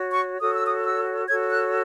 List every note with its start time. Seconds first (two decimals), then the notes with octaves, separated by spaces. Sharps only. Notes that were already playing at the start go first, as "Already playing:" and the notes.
Already playing: F#4 C#5
0.12 C#6
0.40 F#4 A4 C#5 D#6
0.53 E6
0.65 D#6
0.85 E6
1.28 F#4 A4 C#5 G#6
1.51 F#6